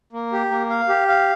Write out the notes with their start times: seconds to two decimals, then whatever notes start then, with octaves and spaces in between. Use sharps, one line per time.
0.13 A#3
0.32 G4
0.51 A#3
0.70 F5
0.89 G4
1.08 F5